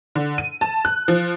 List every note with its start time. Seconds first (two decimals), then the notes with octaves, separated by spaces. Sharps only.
0.16 D3
0.38 D#7
0.61 A5
0.85 F#6
1.08 F3